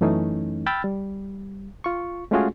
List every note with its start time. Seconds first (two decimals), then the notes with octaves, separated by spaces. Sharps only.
0.01 F#2 E3 A3 C#4 D#4
0.66 G5 B5 E6 F6 A6
0.84 G3
1.84 F4 C#6
2.31 G#3 A3 C#4 F4 F#4 G#4